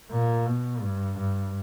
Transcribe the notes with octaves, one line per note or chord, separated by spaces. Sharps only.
A#2
B2
G2
G2